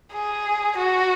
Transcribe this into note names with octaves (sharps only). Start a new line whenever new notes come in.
G#4
F#4